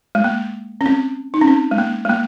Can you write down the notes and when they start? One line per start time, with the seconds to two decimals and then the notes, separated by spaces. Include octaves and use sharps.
0.15 G#3
0.24 A#3
0.81 C#4
0.86 C4
1.34 D#4
1.41 C#4
1.47 C4
1.71 G#3
1.78 A#3
2.05 G#3
2.09 A#3